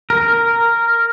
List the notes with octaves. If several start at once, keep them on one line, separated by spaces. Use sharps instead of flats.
A#4